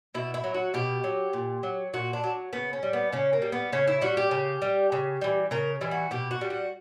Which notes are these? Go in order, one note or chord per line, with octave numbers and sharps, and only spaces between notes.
B2 E4
E4
F#3
F#4
B2 G4
F#3
A#2
F#3
A#2 F#4
D4
F#3
C#3 B3
C#4
G3
B3
C#3 C#4
A#3
G3
B3
C#3 C#4
E4
G3 F#4
G4
C#3
G3
C#3
E3 G3
C#3 A#4
E3 G3
F#4
B2 G4
F#4
G3
F#4